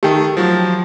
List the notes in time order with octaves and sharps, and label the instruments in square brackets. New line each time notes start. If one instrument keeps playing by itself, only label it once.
[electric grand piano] D#3 A3 [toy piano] G4 G5
[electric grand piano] F3 F#3